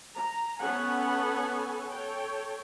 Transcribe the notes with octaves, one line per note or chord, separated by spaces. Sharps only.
A#5
B3 C#4 A4 C#5 F#5 G#5
A4 C#5 G5